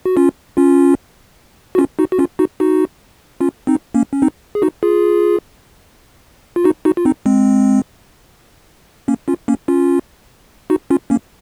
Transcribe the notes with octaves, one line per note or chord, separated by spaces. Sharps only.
F#4
C#4 F4
C#4 F4
F#4
C#4 F4
D#4 F#4
F#4
C#4 F4
D#4 F#4
D#4 F#4
C#4 F4
C4 D#4
A#3 C#4
C#4
C4 D#4
G#4
D#4 F#4
F4 G#4
F4
D#4 F#4
D#4 F#4
F4
C4 D#4
G#3 C4
A#3 C#4
C#4 F4
A#3 C#4
C#4 F4
D#4 F#4
C#4 F4
A#3 C#4